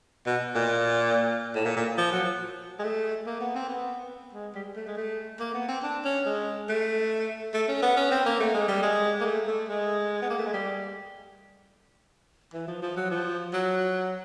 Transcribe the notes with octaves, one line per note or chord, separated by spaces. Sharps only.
B2
A#2
A2
A#2
A#2
F3
F#3
G#3
A3
A#3
B3
C4
B3
G#3
G3
A3
G#3
A3
A#3
B3
C4
D4
C#4
G#3
A3
A3
C#4
B3
C#4
C4
A#3
A3
G#3
G3
G#3
A#3
A3
A3
G#3
B3
A#3
A3
G#3
G3
E3
F3
F3
F#3
F3
F#3